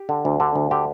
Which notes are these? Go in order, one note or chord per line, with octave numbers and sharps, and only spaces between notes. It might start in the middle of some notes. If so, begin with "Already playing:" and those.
Already playing: G4
D3
D2
D3
D2
D3 G4